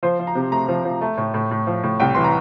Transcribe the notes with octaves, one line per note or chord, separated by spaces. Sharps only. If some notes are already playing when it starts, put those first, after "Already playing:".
F3 C5
F3
A#5
C3
A3 A#5
F3
F3
A3
A2
A2
A2
F3
A2
C2 G5
E3 C6
A#5